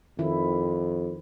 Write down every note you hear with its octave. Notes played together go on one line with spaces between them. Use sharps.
F2 D#3 E4